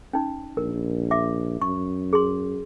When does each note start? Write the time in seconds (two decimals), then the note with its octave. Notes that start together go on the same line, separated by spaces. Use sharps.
0.13 C#4 D#4
0.57 A#1 A#4
1.11 E5 D6
1.62 F#2 C#6
2.13 G#4 C6